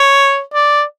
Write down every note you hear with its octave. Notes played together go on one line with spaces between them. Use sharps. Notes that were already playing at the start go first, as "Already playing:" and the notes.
Already playing: C#5
D5